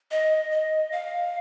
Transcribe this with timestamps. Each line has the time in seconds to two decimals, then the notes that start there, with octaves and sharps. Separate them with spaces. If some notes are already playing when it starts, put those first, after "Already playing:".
0.11 D#5
0.52 D#5
0.92 F5